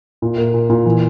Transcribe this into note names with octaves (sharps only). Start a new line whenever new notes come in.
A#2
A#3
A#2
A#2
E3